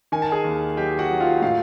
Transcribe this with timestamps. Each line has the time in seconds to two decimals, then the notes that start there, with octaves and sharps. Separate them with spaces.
0.12 D#3 G#5
0.22 A5
0.32 G#4 G#5
0.44 D#2
0.77 F#3 G4 G5
0.99 F#4 F#5
1.10 F#3
1.20 F4 F5
1.42 A2 F4 F5